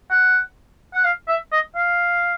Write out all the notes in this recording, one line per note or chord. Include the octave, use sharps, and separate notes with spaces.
F#5
F#5
F5
E5
D#5
F5